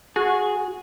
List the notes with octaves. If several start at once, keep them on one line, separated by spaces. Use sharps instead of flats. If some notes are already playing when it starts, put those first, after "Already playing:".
F#4 G#4